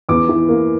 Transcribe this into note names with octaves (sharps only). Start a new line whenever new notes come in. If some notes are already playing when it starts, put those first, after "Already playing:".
E2 D6
E3
A#3